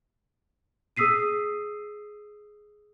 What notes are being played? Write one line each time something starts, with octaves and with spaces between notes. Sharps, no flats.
G#4 D#6 E6 B6 C7 D#7